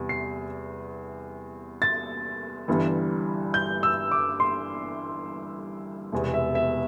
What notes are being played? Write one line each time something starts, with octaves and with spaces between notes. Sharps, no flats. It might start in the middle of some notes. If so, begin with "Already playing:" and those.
Already playing: E2 C3 G3
C7
A6
G1 G2 E3 G3
G6
E6
D6
C6
E1 E2 C3
E5
E5